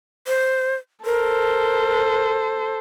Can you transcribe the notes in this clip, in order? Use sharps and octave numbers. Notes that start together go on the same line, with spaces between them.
C5
A4 A#4 C5